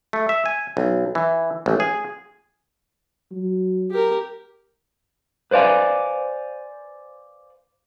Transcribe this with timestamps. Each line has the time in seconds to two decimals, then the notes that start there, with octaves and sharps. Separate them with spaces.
0.13 A3
0.29 E5
0.46 G#5
0.77 B1
1.15 E3
1.66 A1
1.80 G#4
3.31 F#3
3.91 G4 A#4
5.51 B4 C5 D5 F5 G#5